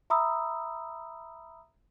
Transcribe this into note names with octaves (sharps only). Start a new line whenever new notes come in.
E5 A#5 B5 D#6 E6